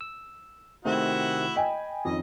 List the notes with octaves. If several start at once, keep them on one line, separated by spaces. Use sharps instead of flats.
E6
C3 D#3 A3 C4 E4 F#4
D#5 G5 G#5 B5
F2 D#3 C#4 D#5